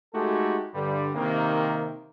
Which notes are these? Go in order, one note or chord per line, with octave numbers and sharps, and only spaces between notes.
G#3 A3 D#4 F#4 G4 A4
G2 D3 G3
C3 D#3 A#3